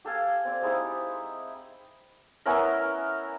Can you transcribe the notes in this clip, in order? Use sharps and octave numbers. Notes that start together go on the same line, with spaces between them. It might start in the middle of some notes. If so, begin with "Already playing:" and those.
G4 A4 F5 G#5
C4 D5
G#3 D#4 E4 G4
B3 C#4 E4 A#4